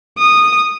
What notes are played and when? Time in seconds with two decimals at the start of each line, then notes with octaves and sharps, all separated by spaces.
0.18 D#6